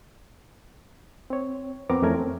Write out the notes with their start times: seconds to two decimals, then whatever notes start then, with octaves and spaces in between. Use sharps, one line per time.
1.30 C4 C#5
1.90 F2 B3 C4 A#4 A#5 D6
2.02 F2 E3 A3 C#4 A#4 G#6
2.15 C4